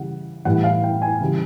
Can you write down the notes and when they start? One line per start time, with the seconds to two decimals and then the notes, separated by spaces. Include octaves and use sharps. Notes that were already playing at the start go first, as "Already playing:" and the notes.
Already playing: C#3 E3 G3 F#5
0.45 A2 E3 G3 F#5
0.64 F5
0.84 G5
1.02 G#5
1.20 C#3 E3 G3